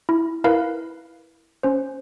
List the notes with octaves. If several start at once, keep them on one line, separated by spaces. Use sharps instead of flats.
E4
E4 A#4 B4 F5
C#4 C5